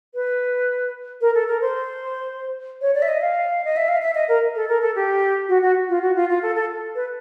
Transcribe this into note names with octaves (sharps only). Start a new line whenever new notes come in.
B4
A#4
A4
A#4
C5
C#5
D5
E5
D#5
F5
D#5
E5
F5
E5
D#5
A#4
A4
A#4
A4
G4
F#4
F#4
F4
F#4
F4
F4
A4
A4
B4